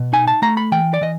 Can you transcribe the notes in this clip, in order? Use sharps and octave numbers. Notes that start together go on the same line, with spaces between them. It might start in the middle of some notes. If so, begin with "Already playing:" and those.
Already playing: B2
D#4 G#5
A5
A3 A#5
B5
E3 G5
D5
E3 D#5